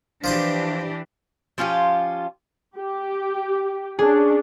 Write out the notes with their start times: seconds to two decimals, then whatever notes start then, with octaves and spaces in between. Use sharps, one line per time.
0.24 E3 F3 D4 G4 C5 C6
1.58 F3 C#4 F4 G4
2.77 G4
3.99 C#4 D4 G#4